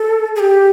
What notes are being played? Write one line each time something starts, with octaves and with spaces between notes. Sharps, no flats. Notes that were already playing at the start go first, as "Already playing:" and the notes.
Already playing: A4
G#4
G4